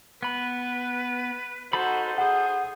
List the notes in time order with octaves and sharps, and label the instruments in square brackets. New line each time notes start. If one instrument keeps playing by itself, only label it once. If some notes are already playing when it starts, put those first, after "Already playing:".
[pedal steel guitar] B3 B5 [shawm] B4
[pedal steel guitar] D#4 A4 B5 [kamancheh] F#4 C5
[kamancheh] G#4 [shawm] C5 [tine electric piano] F#5